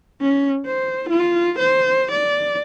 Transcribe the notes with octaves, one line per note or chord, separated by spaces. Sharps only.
C#4
C5
F4
C5
D5